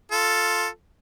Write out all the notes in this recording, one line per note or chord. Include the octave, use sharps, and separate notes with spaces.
F4 A4